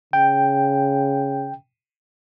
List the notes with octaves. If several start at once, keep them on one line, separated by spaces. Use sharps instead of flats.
C#3 G5